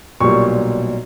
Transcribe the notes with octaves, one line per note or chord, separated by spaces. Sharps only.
B1 A#2 G3 C#6